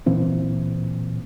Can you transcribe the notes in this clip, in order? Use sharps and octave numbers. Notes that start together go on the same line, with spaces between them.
D1 A#2 E3 C4